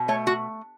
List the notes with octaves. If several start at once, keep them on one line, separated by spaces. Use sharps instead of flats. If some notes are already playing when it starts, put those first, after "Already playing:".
Already playing: B2
A3 C#5
F#4